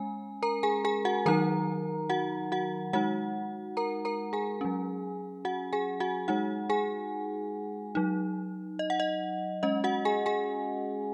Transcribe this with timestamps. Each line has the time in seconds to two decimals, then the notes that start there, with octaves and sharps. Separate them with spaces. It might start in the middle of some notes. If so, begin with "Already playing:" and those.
Already playing: G#3 C#4 G#5
0.43 A#4 A#5
0.63 G#4 G#5
0.85 G#4 G#5
1.05 F#4 F#5
1.26 D#3 F#3 D#4 A#4 A#5
2.10 F#4 F#5
2.52 F#4 F#5
2.93 G#3 D#4 F#4 F#5
3.77 A#4 A#5
4.05 A#4 A#5
4.33 G#4 G#5
4.61 F#3 C#4
5.45 F#4 F#5
5.73 G#4 G#5
6.00 F#4 F#5
6.28 G#3 D#4 F#4 F#5
6.70 G#4 G#5
7.95 F#3 D#4
8.79 D#5
8.90 F#5
9.00 D#5
9.63 G#3 C#4 D#5
9.84 F#4 F#5
10.05 G#4 G#5
10.26 G#4 G#5